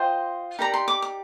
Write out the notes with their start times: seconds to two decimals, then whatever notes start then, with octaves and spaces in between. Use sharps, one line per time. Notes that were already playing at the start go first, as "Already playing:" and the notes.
Already playing: F4 C5 D#5 G5
0.59 D#4 G4 A#4 D5 A#5
0.74 C6
0.88 D6
1.02 D6